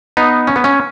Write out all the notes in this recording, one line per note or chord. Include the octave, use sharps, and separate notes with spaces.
B3 D#4
C#4
B3
C#4